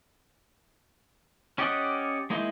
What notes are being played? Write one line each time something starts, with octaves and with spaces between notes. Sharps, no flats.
C#4 G4 D5 D#5 F#5
G#3 A#3 D#4 E4